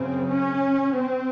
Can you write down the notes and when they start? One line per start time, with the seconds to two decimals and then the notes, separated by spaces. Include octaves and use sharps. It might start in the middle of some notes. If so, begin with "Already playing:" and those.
Already playing: F#2 C#3 C4
0.28 C#4
0.94 C4